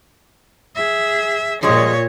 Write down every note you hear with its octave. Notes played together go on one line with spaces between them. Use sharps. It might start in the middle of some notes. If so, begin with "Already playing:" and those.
G#4 E5
A#2 F3 G3 G#3 C#5